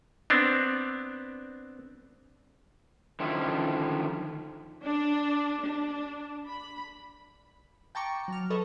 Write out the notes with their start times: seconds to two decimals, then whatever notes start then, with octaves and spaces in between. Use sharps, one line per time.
0.30 B3 C4 D4
3.20 D3 D#3 F3 C#4 E4
4.84 D4
5.62 D4
6.48 B5
7.95 G5 A5 A#5 C#6 D6
8.28 F#3 F6
8.50 A4 B4 C#5 D#5